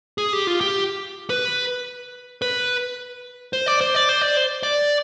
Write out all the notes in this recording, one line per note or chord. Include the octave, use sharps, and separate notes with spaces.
G#4
G4
F4
G4
B4
B4
C5
D5
C5
D5
C5
D5
C5
D5